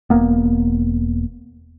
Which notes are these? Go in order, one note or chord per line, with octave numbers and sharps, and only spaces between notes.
E1 A#3 B3